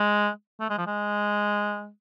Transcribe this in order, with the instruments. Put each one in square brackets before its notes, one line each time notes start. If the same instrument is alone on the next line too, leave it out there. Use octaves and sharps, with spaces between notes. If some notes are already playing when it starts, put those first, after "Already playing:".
Already playing: [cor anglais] G#3
A3
G#3
F3
G#3